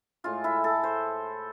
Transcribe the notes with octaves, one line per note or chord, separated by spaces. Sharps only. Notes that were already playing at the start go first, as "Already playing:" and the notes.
A2 G#3 F4
E4
A4
C5